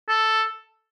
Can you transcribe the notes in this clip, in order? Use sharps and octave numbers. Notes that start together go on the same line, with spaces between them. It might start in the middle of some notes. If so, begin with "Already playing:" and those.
A4